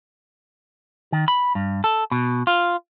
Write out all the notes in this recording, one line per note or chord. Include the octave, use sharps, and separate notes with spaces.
D#3
B5
G2
A4
B2
F4